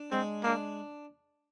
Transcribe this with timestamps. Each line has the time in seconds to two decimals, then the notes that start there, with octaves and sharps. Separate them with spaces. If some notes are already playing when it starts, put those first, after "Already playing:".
Already playing: D4
0.11 G#3 C4
0.43 A#3 D4